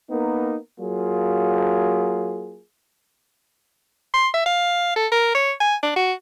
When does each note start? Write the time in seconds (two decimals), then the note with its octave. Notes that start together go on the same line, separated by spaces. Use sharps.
0.11 A#3 B3 D#4 A#4
0.80 F#3 A#3 F4 G#4
4.14 C6
4.34 E5
4.46 F5
4.96 A4
5.12 A#4
5.35 C#5
5.61 G#5
5.83 D4
5.96 F#4